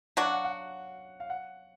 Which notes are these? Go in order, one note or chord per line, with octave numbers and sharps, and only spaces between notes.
F#3 D4 F#4 F#5
F5
F#5
F#5
F5
F#5